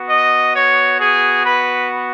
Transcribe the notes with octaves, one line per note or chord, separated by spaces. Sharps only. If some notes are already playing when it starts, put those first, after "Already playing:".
Already playing: B3 F#4
D#5
C#5
G#4
B4